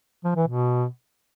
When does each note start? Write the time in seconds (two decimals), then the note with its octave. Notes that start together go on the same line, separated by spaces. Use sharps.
0.24 F3
0.36 E3
0.47 B2